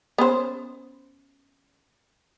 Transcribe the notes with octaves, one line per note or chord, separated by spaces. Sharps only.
B3 C#4 C5